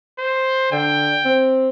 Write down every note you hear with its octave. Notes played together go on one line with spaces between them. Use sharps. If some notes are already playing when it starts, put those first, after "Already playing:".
C5
D3 G5
C4